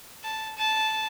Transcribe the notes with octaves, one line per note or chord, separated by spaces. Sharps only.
A5
A5